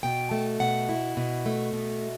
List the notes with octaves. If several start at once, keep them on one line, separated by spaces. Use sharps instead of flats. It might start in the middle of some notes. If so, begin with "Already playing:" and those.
B2 G5
A3
B2 F#5
E4
B2
A3
B2